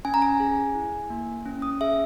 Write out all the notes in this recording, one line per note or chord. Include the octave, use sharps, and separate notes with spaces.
C#4 G#5
A#5
G#5
G#4
E4
A#3
C#4
D#6
G#4 E5